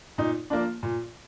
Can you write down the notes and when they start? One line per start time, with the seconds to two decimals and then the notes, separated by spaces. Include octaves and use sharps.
0.18 A#2 D#4
0.50 F3 A#3 D4
0.83 A#2